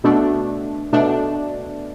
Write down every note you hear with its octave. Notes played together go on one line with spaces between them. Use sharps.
B2 A3 D4
B2 A3 D4